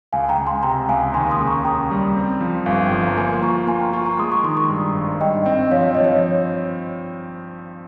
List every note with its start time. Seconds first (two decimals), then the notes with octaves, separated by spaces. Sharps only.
0.13 C#2 F5 G#5
0.29 G5 A#5
0.38 C#2
0.46 G#5 C6
0.63 C3 G5 A#5
0.89 C#2 F5 G#5
1.14 D#2 G#5 C6
1.31 C6 D#6
1.40 C#3
1.47 A#5 C#6
1.64 C#3 G5 A#5
1.91 G3
2.16 C4
2.41 F3
2.66 G1 F5 G#5
2.86 G5
2.91 F3 G#5
3.07 A#5
3.17 A#3 G#5 C6
3.42 F4 A#5 C#6
3.67 A#3 G#5 C6
3.80 G5 A#5
3.93 F4 A#5 C#6
4.06 A#5 C#6
4.19 G#3 C6 D#6
4.32 A#5 C#6
4.44 D#3 C6 D#6
4.57 A#5 C#6
4.69 G2
4.94 G#1
5.20 G2 D#5 G5
5.45 C4 D#5 G5
5.71 F3 C#5 F5
5.95 F3 D#5
6.04 C#5